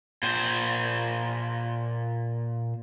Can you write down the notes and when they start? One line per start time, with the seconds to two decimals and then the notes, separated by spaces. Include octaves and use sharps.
0.23 A#2 C5